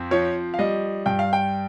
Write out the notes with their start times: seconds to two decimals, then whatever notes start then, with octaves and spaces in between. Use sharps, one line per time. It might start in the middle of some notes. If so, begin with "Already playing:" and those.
Already playing: F2 C4
0.11 F3 C#5
0.54 F5
0.59 G3 D#5
1.06 G2 G5
1.19 F5
1.33 G5